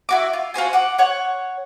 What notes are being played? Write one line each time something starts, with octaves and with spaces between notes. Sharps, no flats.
E4 F#4 D6
F4
F4 F#4 C5 G#5
F#5 D6
C#5 F#5